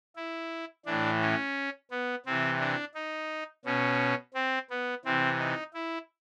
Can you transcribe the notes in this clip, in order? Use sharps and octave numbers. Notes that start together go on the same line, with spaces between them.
E4
A2 E3 D4
C#4
B3
C3 E3 C4
D4
D#4
B2 C#4
C4
B3
C3 E3 C4
D#4
E4